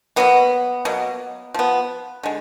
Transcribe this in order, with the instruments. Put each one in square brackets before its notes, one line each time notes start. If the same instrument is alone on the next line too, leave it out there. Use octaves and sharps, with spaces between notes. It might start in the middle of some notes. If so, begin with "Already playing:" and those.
[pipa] B2 F#3 A#3 B3
B2 F#3 A#3
F3 B3
D3 G#3